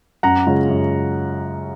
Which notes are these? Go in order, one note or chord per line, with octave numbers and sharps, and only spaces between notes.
F#2 F#5 A#5
C#3 G#3 C#4 F4
F#2